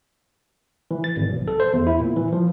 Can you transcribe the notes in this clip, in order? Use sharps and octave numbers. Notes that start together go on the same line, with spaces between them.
E3
A6
G#1
B1
A4
C5
E2
E4
A#2
E3
F3